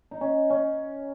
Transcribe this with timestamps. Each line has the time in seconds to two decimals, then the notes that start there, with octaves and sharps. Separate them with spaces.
0.11 D#4
0.21 C#4
0.50 C#4